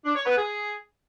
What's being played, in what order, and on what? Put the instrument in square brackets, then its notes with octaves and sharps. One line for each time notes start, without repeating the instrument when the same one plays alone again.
[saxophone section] D4
C#5
B3
G#4